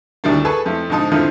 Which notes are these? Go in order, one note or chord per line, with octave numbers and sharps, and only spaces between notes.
D2 A2 D#3 G3 A#3 D4
G#4 A4 B4 G#5 A5 C#6
F2 A3 E4
G#2 D3 F3 D#4 A5 D#6
F2 A2 D3 D#3 F3